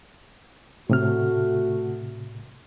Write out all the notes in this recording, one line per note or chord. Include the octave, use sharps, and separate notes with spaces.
A2 C3 A3 F#4 F6